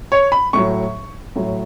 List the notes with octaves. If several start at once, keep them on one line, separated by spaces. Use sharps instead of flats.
C#5
B5
A2 F#3 C#6
A2 F#3